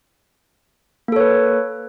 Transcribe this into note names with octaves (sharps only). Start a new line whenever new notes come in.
A#3 A4 B4 C#5